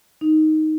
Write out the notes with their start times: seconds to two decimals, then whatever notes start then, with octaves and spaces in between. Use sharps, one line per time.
0.21 D#4